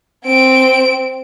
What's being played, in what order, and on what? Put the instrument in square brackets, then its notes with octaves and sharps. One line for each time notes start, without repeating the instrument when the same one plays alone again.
[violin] C4 D7